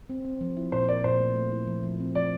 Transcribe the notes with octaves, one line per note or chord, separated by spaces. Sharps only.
C4
C4
F3
E4
A#2 C5
A#4 D5
A#2 C5
A3
A3
E4
F3
F3
C4
F3 D5